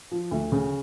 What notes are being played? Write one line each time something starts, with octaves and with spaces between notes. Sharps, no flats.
F3
D2
C#3